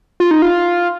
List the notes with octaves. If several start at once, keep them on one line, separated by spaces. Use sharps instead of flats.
F4
D#4
F4